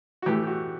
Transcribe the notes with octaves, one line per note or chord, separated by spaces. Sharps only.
F#4
A2 E3 A3 G4
G4
F#4